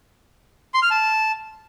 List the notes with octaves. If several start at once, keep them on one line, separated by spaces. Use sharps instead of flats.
C6
F6
A5